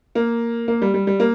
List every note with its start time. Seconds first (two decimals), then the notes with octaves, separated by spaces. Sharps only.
0.15 A#3
0.68 A#3
0.82 G3
0.94 G3
1.07 G3
1.20 A#3